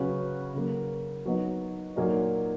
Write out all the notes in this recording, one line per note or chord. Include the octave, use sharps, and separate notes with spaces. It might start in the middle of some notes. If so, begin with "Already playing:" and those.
Already playing: C#3 F#3 C#4 F#4 B4
C#3 F#3 A#3
F#3 B3 D#4
A#2 F#3 A#3 D#4